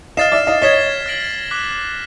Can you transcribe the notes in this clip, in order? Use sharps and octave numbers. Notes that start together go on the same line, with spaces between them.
D#5 F5 F6 A6 C7 E7
D5 E5
D#5 F5
C#5 D#5 G#6 B6 E7 G7
F6 A#6 D7 F#7
D6 F#6 B6